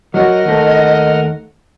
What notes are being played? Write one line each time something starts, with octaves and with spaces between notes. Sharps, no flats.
F#3 F#4 A#4 D#5 F#5 F6
D#2 A3